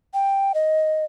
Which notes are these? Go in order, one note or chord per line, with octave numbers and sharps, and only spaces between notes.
G5
D#5